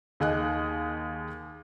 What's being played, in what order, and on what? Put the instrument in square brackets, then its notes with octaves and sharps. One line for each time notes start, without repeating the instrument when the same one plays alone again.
[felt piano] D#2 G#4 D#5 F#6